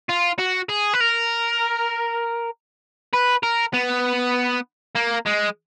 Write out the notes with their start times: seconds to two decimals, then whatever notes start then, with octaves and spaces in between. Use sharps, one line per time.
0.09 F4
0.39 F#4
0.69 G#4
0.93 B4
1.00 A#4
3.14 B4
3.43 A#4
3.74 B3
4.96 A#3
5.27 G#3